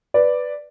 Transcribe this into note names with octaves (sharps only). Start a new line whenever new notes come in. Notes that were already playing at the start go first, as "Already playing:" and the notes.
B4 D5